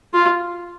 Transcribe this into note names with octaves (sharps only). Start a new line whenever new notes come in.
F4